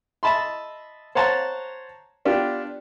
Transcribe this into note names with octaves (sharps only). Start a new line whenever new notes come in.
D#5 E5 A5 B5 C6
C5 C#5 F#5 A5 A#5 C6
B3 D4 F4 G4